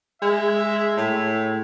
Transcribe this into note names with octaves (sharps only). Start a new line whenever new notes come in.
G#3 E5
A2